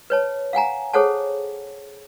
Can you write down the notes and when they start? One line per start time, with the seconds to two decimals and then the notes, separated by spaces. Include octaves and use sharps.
0.10 B4 C#5 A5
0.53 F5 F#5 G#5 A#5
0.94 G#4 A4 C5 C#5 F#5 A5